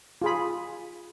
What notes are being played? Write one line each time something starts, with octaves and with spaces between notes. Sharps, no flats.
F4 G#4 B5